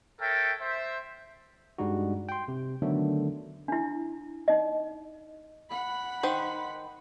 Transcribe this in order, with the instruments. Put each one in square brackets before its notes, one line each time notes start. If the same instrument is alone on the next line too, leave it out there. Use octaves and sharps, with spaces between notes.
[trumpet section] A4 A#4 C#5 E5 G5
C5 E5
[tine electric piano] G2 G3 G#3 D#4 F#4
G5 C6
C3
D3 D#3 F#3 A3 B3 D4
[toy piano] D4 E4
D#4 D#5
[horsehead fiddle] F#5 B5
[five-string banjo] D#3 C5